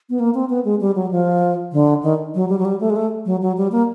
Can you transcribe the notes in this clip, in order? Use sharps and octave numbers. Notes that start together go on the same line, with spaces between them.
B3
A#3
C4
B3
G#3
G3
F#3
F3
D3
D#3
F#3
G3
F#3
G3
A3
G#3
A3
F#3
F#3
G3
A#3